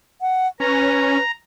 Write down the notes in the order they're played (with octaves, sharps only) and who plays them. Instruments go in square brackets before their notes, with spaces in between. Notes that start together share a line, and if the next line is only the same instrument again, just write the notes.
[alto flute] F#5
[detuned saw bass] C#4 [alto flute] B4 [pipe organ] A#5